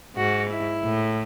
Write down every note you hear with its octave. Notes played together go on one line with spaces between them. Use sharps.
G#2 F#4
E4
A2